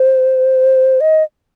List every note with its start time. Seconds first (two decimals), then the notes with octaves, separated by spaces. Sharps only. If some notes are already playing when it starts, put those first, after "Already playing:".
Already playing: C5
1.01 D#5